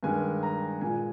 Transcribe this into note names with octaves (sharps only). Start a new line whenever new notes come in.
G2 D#3 G#3 G#5
A#5
A#2 G#3 G#5